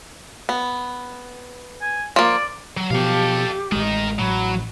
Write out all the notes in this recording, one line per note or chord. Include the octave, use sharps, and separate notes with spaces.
B3
G#5
F3 A#3 D5
F#3
B2 F3 B3 G4 A4 F5
A1 G#3 A#4 D#5
A1 A2 F#3 B5